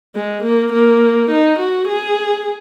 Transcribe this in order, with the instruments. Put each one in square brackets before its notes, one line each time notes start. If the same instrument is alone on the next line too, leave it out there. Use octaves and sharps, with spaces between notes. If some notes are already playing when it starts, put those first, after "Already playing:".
[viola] G#3
A#3
A#3
D#4
F#4
G#4